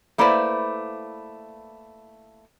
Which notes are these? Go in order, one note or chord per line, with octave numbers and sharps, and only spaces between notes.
A3 A#3 E4 B4 C5 D5